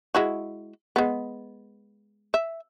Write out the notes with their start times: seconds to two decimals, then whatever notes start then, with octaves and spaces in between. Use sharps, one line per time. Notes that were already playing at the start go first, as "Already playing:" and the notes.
0.15 G#3 E4 F#4
0.96 G#3 B3
2.34 E5